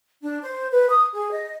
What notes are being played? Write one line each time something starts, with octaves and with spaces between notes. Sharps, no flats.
D4
C5
B4
D#6
G#4
D#5